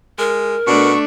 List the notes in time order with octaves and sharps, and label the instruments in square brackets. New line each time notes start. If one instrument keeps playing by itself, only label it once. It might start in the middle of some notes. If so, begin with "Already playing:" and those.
[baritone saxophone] G#3 [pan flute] A#4
[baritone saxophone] B2 [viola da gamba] A3 D4 [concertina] C#6